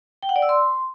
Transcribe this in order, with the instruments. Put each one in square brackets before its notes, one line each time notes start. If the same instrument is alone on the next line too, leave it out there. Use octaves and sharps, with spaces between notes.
[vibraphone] G5
F#5
D5
E6
C6